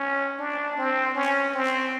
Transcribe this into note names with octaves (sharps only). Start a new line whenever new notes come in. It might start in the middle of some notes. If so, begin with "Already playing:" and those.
Already playing: C#4
D4
C4
C#4
C4